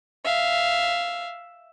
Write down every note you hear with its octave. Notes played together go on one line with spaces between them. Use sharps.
E5 F5